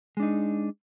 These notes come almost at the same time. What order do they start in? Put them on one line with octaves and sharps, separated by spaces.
G#3 D4 D#4